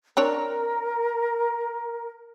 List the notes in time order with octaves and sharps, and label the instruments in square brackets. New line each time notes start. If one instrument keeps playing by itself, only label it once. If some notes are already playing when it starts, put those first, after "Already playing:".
[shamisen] C4 D4 C#5 [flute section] A#4